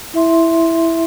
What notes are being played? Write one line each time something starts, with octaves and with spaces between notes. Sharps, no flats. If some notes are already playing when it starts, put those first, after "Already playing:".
E4 E5 C6